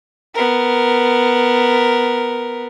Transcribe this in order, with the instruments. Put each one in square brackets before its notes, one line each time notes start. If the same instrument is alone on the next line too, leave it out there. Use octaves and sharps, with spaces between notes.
[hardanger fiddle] B3 A#4